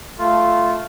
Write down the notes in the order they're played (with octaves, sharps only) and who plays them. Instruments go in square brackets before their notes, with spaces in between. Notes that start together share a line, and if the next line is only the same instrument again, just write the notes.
[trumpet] A3 [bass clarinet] F4